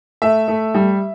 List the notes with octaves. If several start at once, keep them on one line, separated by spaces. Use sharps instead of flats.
A3 E5
A3
G3